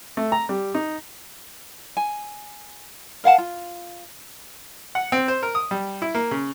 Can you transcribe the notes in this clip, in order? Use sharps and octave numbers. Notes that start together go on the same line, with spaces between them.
A3
A#5
G3
D#4
G#5
A#4 F5 F#5 A5
F4
F#5
C4
C5
A#4
D#6
G3
E4
A#3
C#3